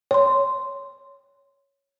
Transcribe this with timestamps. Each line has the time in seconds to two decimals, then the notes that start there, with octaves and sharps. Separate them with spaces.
0.11 C#5 C6